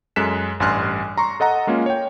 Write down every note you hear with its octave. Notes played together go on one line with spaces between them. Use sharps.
F#2 G#3 A4 F#6 B6 E7
A1 G2 G#5 C6 F6 F#6
A#5 C6 C#6
A4 D#5 F#5 A#5
G#3 A#3 C#4 F4
C#5 G5